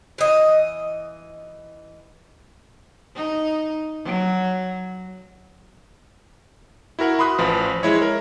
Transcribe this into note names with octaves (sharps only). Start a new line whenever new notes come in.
E3 D#5
D#4
F#3
E4 F#4 A#4 F#5
B5 C6 D#6 F#6
A1 F3 B4
G#3 E4 C#5
A#4